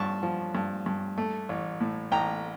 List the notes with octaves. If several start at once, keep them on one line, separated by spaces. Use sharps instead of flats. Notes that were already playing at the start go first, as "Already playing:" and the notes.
Already playing: G2 F3 A5 C#6
F3
G2
G2
A3
A1
A2
A1 G5 A#5